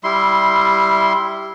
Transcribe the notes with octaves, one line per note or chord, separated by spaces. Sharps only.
G3 E4 C6